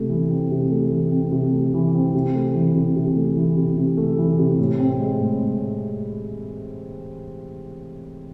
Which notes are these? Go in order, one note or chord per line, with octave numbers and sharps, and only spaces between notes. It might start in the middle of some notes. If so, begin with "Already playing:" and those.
Already playing: C3 A3
E3
C4
C3
A3
E3
C4
C3
A3
E3
C4
C3
A3
E3
C3
C3
A3
E3
C3
C3
A3
E3
C3
A2
C4
G#3
A2
A2